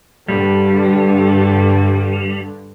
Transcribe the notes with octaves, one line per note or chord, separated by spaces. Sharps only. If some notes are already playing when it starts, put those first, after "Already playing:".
G2 D3 G3